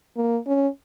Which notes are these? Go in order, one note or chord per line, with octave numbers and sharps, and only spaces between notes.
A#3
C#4